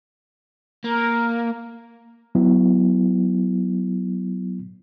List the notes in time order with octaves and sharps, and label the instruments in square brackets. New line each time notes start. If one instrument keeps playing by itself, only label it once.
[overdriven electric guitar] A#3 [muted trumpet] A#4
[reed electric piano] F#3 B3 E4